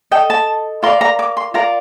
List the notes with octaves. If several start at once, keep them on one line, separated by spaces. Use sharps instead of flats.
A4 D#5 G5
A5
F4 A#4 D5 C6
A#5
D6
C6
F4 A#4 D5 A#5